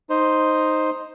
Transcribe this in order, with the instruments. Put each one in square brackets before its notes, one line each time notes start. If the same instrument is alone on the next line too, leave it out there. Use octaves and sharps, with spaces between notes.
[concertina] D#4 C5